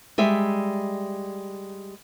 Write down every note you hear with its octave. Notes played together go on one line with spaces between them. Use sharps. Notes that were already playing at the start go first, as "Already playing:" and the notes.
G3 G#3 E5